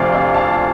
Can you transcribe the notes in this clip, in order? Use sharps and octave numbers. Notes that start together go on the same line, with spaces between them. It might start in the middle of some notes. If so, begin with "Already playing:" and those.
Already playing: D2 C3 F3 C4 D5 F5
F5
F5 A5